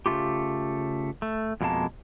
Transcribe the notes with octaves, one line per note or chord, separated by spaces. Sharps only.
C#3 G#3 A3 F4 G4
A3
F2 B2 G#3 A#3 A5